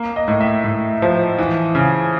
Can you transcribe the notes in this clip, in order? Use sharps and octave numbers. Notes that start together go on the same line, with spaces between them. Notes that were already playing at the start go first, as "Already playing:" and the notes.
Already playing: A#3
D#5
A2
E5
A2
F3
E3
C#3